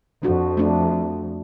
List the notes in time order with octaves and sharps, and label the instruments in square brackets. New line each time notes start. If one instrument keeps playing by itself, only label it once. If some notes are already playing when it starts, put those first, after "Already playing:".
[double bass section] F2 [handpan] D4 F#4
[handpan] A3 D4